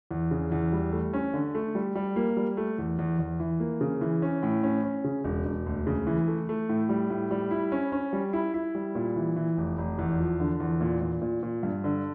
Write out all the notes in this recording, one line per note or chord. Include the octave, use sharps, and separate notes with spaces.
E2
C#3
E2
G3
A3
C#4
D3
A3
G3
G3
A#3
G3
A3
E2
E2
E2
E3
A#3
C#3
E3
C#4
A2
C#4
C#4
C#3
E1
E1
D2
C#3
E3
A3
A3
A2
G3
A2
G3
E4
C#4
C#4
G3
E4
E4
G3
A#2
E3
E3
F1
F1
E2
F3
D3
E2
A#2
A#2
A#2
A#2
G2
D3